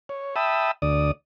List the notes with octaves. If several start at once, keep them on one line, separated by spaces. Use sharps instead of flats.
C#5
E5 G5 A5 B5 D#6 E6
D2 D5 D#6